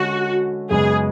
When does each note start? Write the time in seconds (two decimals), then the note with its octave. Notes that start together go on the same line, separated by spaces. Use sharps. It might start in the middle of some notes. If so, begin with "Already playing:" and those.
Already playing: D3 G#3 C#4 F#4
0.71 F#2 C#3 G#3 B3 G#4